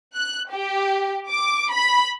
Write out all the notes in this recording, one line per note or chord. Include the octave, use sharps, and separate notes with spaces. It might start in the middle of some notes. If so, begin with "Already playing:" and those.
F#6
G4
D6
B5